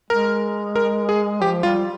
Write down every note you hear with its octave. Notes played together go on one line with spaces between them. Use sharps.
G#3 A#4
A#4
G#4
F3 G4
G3 F4